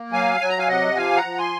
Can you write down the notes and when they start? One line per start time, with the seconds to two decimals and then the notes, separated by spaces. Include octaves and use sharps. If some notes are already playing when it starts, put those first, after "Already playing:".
Already playing: A#3
0.12 F#3 F5 G#5
0.40 F#3 G#5
0.49 A#5
0.58 F5 G#5
0.68 C3 D#5 F#5
0.96 F3 F5 G#5
1.17 F#5 A#5
1.25 F3
1.38 G#5 C6